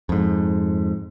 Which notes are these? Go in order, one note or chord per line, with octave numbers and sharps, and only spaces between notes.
F2 G#2